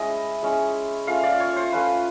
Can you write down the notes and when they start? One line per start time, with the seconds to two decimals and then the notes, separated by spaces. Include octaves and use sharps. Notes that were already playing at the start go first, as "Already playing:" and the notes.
Already playing: G#3 C#4 E4 D#5
0.42 G#3 C#4 E4
1.07 A3 C#4 F4 F5
1.23 D5
1.40 C#5
1.56 C5
1.72 A3 C#4 F4 B4